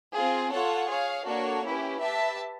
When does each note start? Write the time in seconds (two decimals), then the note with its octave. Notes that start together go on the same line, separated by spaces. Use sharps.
0.13 C4 F4 G#4
0.51 F4 A4 C#5 F#5
0.88 G#4 C#5 F5
1.25 A#3 D4 F#4 A4 C#5
1.63 C#4 E4 G4 B4
2.00 G4 B4 E5 A5